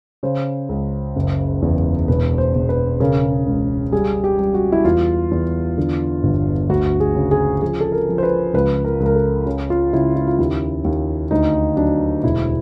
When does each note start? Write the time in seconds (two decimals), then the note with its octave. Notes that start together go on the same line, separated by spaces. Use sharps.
0.23 C#3 C5
0.69 C#2
1.16 F#1
1.62 E2
2.08 E1 B4
2.38 C5
2.54 E1
2.69 B4
3.00 C#3 A#4
3.46 C#2
3.92 G3 G#4
4.24 G4
4.39 G3
4.54 F#4
4.72 E4
4.84 E2 F4
5.31 E2
5.78 D3
6.23 G1
6.69 D2 F#4
7.00 G#4
7.15 C#3
7.31 G#4
7.62 F3 G#4
7.81 A4
7.92 A#4
8.09 F3
8.18 C5
8.23 B4
8.54 C#2 B4
8.85 A#4
9.00 C#2
9.06 A#4
9.15 A4
9.46 C#3
9.70 F4
9.93 C#3 E4
10.16 E4
10.28 F4
10.38 D#2 E4
10.85 D#2
11.31 D2 D#4
11.77 F#3 D4
12.24 E1 E4